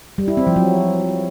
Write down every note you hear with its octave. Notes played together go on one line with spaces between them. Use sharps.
G3
E4
C4
F3
F#3